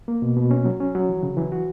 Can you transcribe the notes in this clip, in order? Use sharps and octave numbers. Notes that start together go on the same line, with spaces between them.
A#3
B2
B2
C#4
F#3
C#4
F#3
E3
C#3
E3
F#4